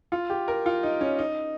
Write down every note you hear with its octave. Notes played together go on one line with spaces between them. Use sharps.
F4
G4
A#4
F4
D#4
C#4
D#4